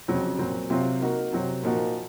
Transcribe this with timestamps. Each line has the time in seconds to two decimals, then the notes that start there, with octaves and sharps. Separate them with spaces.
0.08 F2 C#3 F#3 C4
0.39 A#2 F#3 C4
0.70 C3 F#3 C4 F4
1.01 A#3 D#4 F#4 A#4
1.33 C3 F#3 C4
1.63 A#2 F3 A#3 D#4 F#4